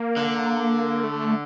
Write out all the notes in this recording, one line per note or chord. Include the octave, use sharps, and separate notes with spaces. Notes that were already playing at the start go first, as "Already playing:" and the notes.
Already playing: A#3
D3
A3